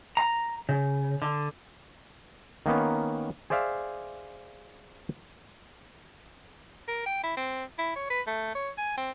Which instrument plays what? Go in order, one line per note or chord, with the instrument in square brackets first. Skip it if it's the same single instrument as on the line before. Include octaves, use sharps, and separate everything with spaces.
[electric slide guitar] A#5
C#3
D3
[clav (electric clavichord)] D#3 A#3 B3 C#4
G#4 C5 D5 E5 F5
[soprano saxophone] A#4
G5
E4
C4
E4
C#5
B4
A3
C#5
G#5
C4